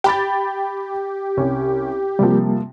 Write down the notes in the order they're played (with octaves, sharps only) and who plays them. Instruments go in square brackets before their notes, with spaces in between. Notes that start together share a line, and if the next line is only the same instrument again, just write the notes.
[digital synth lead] G4 [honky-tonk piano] G5 B5 A6
[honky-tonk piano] C2 C#4
[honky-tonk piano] C3 F3 [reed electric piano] G3 A#3